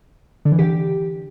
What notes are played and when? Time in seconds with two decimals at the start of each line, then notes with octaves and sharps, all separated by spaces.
0.45 D3
0.52 E3
0.59 G4